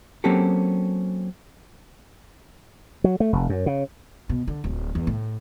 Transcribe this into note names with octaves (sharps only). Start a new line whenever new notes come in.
F#3 A#3 C4 C#4 G4 A4
F#3
A3
F1
F#2
C#3
B2
D3
D1
E2
A2